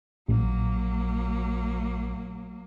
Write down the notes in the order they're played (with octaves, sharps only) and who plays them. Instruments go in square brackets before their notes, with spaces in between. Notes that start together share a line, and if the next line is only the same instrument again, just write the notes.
[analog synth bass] A#1 [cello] F#3 A#3